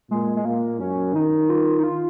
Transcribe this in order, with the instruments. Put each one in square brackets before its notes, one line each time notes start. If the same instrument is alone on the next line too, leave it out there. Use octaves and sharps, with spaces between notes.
[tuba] A#2 [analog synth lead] G#3
[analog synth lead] G#3
[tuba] A#2 [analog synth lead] A#3
[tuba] F#2 [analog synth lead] C#4
[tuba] D#3 [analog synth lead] D#4
[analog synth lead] F4
D#4
F4